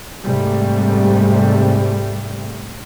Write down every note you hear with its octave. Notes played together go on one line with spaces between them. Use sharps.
G#2 C3 G3 A3